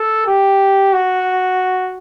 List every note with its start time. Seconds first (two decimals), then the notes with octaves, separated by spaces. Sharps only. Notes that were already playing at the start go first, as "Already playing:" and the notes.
Already playing: A4
0.27 G4
0.93 F#4